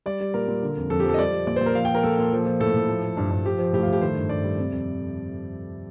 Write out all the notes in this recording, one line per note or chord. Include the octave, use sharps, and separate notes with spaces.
G3 D5
G3
A#2 A#4
A#2
D3
F2
F2 A4
G4
F3 A4
D#5
G3 D5
G3
A#2 D5
C5
A#2
A#4
F3 F5
G5
F3 A#4
A#2 A4
A#2
F3
F3
A2 A4
A2
F3
F3
G2
G2
F3 G4
F3
A2 G4
F4
A2
G4
D#3 C5
G2
G2 D5
G3
C3
F2